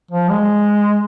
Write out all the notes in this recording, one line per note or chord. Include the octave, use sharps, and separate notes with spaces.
F3
G#3